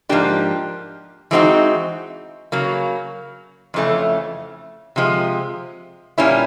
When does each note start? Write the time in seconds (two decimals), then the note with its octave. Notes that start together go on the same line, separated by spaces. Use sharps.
0.09 G#2 F3 A#3 D4 G4
1.31 E3 G#3 C4 D#4 F#4
2.52 C#3 F#3 A#3
3.74 F2 C#3 E3 A3 C#4
4.96 C3 F3 G#3
6.18 A#2 G3 A#3 C#4 E4